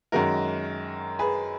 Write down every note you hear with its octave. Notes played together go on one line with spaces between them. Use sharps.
F#2 D#3 G#3 F#4 A#4
G#4 B4